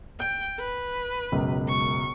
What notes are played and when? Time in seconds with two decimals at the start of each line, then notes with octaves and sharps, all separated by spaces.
0.20 G5 G6
0.59 B4
1.32 E1 C#2 F#2
1.69 C#6